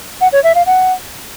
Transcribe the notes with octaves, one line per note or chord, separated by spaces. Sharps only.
F#5
C#5
E5
F5
F#5